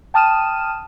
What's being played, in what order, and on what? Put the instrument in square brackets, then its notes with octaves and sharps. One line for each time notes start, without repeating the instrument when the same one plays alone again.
[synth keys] G5 A5 D#6 F6 D#7 E7